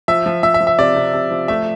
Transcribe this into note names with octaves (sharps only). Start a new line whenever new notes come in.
F3 E5
F3
F3 E5
E5
F3
E5
C3 D5
C3
C3
F3
A3 E5